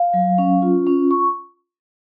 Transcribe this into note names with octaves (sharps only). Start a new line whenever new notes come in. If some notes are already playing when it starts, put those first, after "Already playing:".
Already playing: F5
F#3
C#4
F4
C#4
C#6